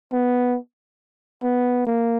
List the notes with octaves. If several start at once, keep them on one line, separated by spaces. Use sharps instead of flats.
B3
B3
A#3